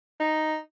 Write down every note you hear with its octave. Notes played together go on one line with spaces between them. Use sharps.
D#4